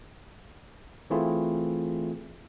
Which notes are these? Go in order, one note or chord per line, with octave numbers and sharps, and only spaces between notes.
E3 A3 C4 E4 F4 G#4